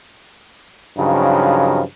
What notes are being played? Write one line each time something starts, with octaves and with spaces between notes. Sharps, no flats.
G2 C#3 F3 F#3 D#4